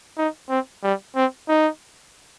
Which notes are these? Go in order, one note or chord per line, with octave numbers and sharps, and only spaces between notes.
D#4
C4
G3
C4
D#4